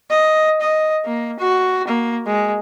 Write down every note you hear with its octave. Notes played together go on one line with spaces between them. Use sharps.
D#5
D#5
A#3
F#4
A#3
G#3